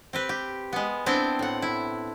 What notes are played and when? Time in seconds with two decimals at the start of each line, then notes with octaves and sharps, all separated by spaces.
0.13 C4 G4 B4
0.29 G4
0.73 G#3 B3
1.06 B3 C4 D4 E4 G5
1.39 A2 F#5
1.62 E4